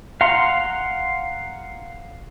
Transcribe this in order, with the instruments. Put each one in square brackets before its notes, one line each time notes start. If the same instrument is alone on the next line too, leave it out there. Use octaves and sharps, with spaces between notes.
[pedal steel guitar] F5 F#5 A#5 C6